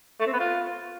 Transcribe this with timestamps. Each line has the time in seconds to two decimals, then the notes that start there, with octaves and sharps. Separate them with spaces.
0.20 A3
0.27 C4
0.33 B3
0.39 F4